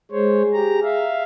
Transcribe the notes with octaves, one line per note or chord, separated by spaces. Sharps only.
G#3 G#4 C5 C#5
G4 A#5
E5 F5